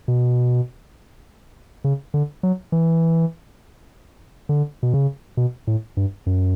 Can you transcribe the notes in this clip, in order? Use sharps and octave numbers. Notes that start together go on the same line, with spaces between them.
B2
C#3
D3
F#3
E3
D3
B2
C#3
B2
A2
G2
F#2